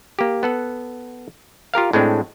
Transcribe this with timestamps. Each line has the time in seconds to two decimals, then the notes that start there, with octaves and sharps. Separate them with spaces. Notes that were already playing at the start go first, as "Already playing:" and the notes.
0.19 A#3 G4
0.43 B3 A4 F#5
1.74 F4 G4 A#4 F5
1.93 A2 G#3 C4 D4